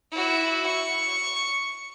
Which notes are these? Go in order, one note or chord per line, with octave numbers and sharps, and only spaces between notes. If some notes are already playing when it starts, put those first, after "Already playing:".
E4 F#4
C#6